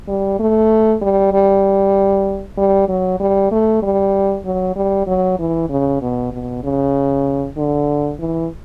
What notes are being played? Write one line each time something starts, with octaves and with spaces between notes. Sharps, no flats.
G3
A3
G3
G3
G3
F#3
G3
A3
G3
F#3
G3
F#3
E3
C#3
B2
B2
C#3
D3
E3